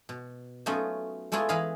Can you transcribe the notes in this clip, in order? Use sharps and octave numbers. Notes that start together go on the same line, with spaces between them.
B2
F#3 A3 B3 C#4 D#4 F4
G#3 A3 B3 E4 F4 G#4
E3 G#4 D#5 F5 B5